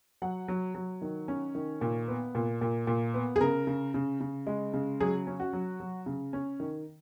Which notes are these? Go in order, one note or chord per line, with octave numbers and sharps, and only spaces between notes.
F#3 F#5
F#3
F#3
D#3
C#4
D#3
A#2
B3
A#2
A#2
A#2
B3
G#4
C#3 A#4
C#3
C#3
C#3
G#3
C#3
F#3 G#4
C#4
F#4
F#3
F#3
C#3
C#4
D#3